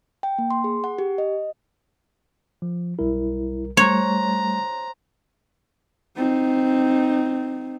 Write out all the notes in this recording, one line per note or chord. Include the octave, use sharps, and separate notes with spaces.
G5
A#3
C6
G#4
F#5
G4
D#5
F3
B1 G3 E4 A#4
G3 A3 C5 C#5 A#5 C6 F#6
C4 D#4